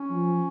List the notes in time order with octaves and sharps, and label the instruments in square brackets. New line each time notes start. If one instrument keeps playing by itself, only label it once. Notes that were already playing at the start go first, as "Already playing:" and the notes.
Already playing: [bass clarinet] C#4
[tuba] F3